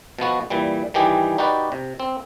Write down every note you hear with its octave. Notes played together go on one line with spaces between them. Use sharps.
B2 F3 B3 F#4
A#2 E3 G3
D#3 E3 G3 G4 G#4
D#4 F#4 G4 B4 D5
C3
C4